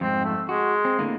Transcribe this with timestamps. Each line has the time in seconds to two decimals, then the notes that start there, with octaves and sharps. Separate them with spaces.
0.01 F2 G#2 C4
0.24 A3
0.49 G#3 F#4
0.85 C4
0.99 A2 D3 A#3